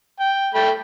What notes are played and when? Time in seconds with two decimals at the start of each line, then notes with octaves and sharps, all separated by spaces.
0.20 G5
0.54 A3 G5 B5